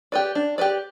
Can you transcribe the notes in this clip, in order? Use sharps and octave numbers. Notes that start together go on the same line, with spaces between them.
G4 B4 D5
D4
G4 B4 D5